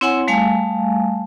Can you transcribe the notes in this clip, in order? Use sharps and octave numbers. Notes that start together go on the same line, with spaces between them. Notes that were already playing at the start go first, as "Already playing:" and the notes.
C4 E4 C#5 F#5 G#5 C6
G3 A3 F5 G#5